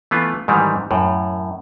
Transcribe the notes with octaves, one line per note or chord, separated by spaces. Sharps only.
E3 A3 B3 F4
G#2 D#3 E3 G3
F#2 A2